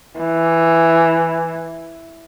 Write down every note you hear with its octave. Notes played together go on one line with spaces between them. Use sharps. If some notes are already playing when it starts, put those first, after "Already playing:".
E3